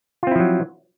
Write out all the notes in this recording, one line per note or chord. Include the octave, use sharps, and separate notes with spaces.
F3 F#3 C4 E4 F4